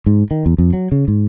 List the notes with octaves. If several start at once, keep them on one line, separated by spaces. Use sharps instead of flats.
G#2
D#3
E2
F2
F#3
C#3
G#2